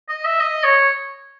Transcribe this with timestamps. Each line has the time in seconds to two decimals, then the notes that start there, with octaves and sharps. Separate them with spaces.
0.09 D#5
0.25 E5
0.40 D#5
0.63 C#5